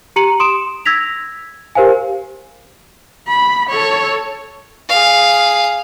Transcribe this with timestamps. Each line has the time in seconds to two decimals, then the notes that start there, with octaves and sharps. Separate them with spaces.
0.16 G4 A#5 C#7 D#7 F#7
0.40 C6 D#6 D7 E7
0.86 E6 G#6 A#6 B6 F7
1.75 G4 A#4 C5 F5 G#5
3.28 B5
3.69 A4 C#5
4.89 G#4 F5